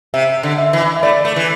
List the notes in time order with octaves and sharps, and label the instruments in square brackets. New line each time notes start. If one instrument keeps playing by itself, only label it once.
[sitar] C3 [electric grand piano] E5
[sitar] D3
[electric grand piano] E5
[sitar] E3
[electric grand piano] E5
[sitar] A3 [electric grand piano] D5
[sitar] A3
E3